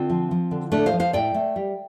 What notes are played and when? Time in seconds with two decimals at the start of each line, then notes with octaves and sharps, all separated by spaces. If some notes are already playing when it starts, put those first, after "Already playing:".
Already playing: D3 C4 F4
0.10 F3
0.31 F3
0.51 D3
0.72 A2 A3 D4
0.86 C5 F5
0.92 F3
1.00 C5 F5
1.13 A2 D5 G5
1.34 A3
1.56 G3